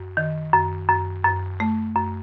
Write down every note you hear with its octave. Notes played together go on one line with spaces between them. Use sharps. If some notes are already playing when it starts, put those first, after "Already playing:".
Already playing: F#2
D#3
F#2
F#2
F#2
A3
F#2